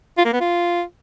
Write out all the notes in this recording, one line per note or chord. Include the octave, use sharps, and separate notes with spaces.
F4
A#3
B3
F4